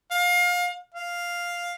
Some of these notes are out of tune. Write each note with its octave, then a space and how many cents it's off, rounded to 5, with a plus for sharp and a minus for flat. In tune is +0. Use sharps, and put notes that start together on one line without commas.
F5 +30
F5 +0